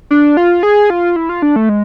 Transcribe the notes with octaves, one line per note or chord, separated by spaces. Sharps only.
D4
F4
G#4
F4
E4
F4
D4
A3
G#3